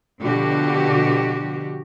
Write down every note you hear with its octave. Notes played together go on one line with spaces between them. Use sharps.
B2 D3 F3 F#4 G4